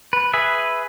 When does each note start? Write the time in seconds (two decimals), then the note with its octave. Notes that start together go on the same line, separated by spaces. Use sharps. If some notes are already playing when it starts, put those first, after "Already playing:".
0.13 B4
0.34 G#4 B4 E5